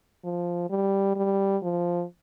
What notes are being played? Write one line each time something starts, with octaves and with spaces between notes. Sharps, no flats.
F3
G3
G3
F3